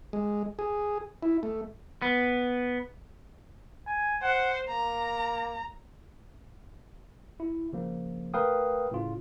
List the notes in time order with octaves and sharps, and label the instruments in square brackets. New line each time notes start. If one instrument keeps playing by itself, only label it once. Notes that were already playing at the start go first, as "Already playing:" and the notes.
[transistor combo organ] G#3
G#4
E4
A3
[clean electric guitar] B3
[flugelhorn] G#5
[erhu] C5 [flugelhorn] F#5
[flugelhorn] A#3 [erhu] A#5
[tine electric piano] E4
C#3 F3 A#3
A3 A#4 B4 F5 G5 D#6
A2 C#3 F4